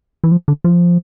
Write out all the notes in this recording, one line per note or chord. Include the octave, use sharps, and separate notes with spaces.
E3
F3
D3
F3